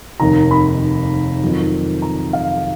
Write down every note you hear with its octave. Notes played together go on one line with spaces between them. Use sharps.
F1 D#2 D#3 A#5
B5
F2 D#3 F#3
A#5
F5